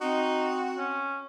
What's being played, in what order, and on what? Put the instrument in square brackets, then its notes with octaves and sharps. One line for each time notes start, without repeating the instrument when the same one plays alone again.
[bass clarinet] C4 [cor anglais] D#4 [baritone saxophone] F#4
[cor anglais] C#4